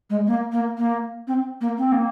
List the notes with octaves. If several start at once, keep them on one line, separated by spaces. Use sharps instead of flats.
G#3
A#3
A#3
A#3
C4
A#3
C4
A#3